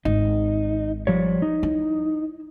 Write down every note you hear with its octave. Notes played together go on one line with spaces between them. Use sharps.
G#1 D#4
F3 G3 C#5
D#4
E4